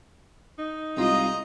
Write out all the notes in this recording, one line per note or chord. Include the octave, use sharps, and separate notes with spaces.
D#4
C2 G#3 F4 D#5 A#5